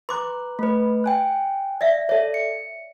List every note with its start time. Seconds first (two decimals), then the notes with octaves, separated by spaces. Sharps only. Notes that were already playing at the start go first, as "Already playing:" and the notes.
0.09 B4 A#5 C6 D6 F#6
0.59 A3 B4
1.04 G5 G#5 F#6
1.81 D5 E5 F5
2.09 A4 C#5 D5 E5
2.34 C#7